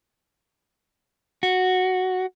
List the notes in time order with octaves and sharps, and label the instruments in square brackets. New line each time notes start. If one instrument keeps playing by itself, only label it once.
[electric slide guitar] F#4